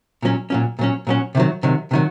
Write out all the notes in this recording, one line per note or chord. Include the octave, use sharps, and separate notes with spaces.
A#2 F#3 C#4
A#2 F#3 C#4
A#2 F#3 C#4
A#2 F#3 C#4
C3 D#3 F#3
C3 D#3 F#3
C3 D#3 F#3